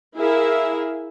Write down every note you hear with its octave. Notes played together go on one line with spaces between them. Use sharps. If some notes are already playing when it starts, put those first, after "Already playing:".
E4 G#4 A#4 E5 F5